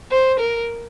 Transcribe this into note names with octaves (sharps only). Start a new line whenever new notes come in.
C5
A#4